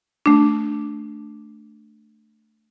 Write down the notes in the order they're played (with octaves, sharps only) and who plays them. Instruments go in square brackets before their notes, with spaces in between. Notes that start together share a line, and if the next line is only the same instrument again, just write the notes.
[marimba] A3 D4